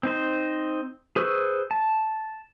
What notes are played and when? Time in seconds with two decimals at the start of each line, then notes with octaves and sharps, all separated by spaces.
0.03 C4 D#4 C5
1.16 G#4 B4 C5 C#6 E6
1.71 A5